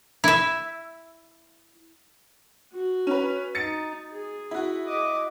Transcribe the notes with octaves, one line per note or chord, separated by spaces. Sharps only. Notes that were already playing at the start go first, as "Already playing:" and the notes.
E4 E5
F#4
C#4 B4
D#4 A6 C#7
G#4
E4 F#4
D#5 D6